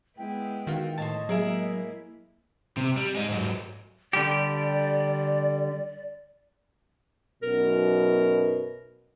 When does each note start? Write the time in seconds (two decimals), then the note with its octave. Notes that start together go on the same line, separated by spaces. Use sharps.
0.18 G#3 B3 E4 G5
0.67 D#3 F4 F#4
0.98 A2 C5 C#5 D#5 A5
1.29 F#3 G#3 A#3 E4 G#4 A#4 E5
2.77 C3
2.97 G3
3.15 G#3 D#4
3.29 G#2 F#3
4.13 D3 G3 G4 D5
7.43 B1 F#2 B2 A#4